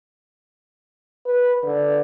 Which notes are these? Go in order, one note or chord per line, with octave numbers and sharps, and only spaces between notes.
B4
D3